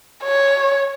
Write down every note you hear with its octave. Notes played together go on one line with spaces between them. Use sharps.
C#5